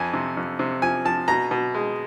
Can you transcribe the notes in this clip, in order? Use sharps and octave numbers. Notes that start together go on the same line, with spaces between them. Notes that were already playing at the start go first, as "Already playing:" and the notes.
Already playing: F2 G#5
C3
F2
C3
F3 G#5
F3 A5
B2 A#5
B2
G#3